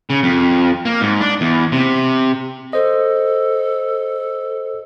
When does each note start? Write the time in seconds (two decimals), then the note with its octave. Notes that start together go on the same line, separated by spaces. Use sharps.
0.10 C#3
0.23 F2
0.85 A#3
1.01 G#2
1.21 D4
1.41 E2
1.72 C3
2.73 A4 C5 D#5